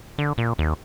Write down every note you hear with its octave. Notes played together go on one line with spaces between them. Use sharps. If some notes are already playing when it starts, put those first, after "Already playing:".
D3
A#2
D#2